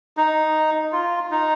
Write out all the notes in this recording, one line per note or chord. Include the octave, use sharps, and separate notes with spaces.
D#4
F4
D#4